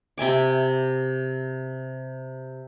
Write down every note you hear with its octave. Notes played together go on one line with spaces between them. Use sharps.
C3 E5 G#5 D6